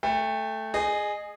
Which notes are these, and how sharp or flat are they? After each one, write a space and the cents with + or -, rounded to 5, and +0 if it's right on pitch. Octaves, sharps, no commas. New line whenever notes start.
A3 +0 G5 +35
G#4 +0 D#5 -25